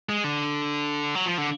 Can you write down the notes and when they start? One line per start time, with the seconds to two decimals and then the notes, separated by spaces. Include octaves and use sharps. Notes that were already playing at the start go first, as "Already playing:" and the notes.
0.09 G#3
0.24 D3
1.15 F#3
1.26 F3
1.38 D3